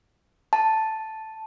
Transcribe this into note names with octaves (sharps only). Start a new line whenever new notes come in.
A5